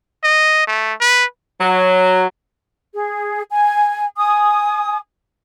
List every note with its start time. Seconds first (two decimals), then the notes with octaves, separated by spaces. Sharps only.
0.24 D#5
0.67 A3
1.00 B4
1.59 F#3
2.93 G#4
3.50 G#5
4.17 G#5 D#6